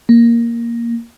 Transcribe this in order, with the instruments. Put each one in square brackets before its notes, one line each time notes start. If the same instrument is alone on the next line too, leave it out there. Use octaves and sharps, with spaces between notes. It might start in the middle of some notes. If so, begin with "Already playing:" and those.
[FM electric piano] A#3